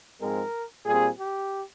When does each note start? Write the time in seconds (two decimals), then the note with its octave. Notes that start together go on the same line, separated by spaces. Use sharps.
0.20 G#2 F3 G#3 C4 A#4
0.86 A#2 G3 C4 G#4
1.17 G4